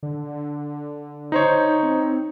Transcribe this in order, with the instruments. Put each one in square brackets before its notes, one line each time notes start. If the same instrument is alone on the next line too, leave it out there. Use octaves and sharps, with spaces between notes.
[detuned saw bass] D3
[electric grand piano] D#4 C5 C#5
[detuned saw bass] C4